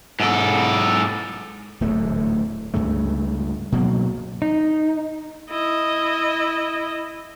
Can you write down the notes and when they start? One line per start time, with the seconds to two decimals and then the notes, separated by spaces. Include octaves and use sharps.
0.20 G#2 A4
1.81 D1 E2 G#2 A3
2.74 C#2 G2 C#3 A3
3.72 B2 F#3 G#3 A#3
4.42 D#4
5.51 E4 D#5